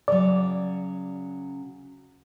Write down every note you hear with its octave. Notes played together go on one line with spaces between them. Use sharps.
C#3 F#3 D5